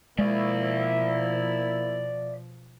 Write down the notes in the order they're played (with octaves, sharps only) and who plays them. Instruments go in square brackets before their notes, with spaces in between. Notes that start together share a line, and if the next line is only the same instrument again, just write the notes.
[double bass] B2 F3 [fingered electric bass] G#3 [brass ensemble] A#3 E4 [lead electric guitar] D5 E5